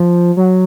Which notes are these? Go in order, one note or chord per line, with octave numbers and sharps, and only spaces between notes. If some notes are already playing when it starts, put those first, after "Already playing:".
Already playing: F3
F#3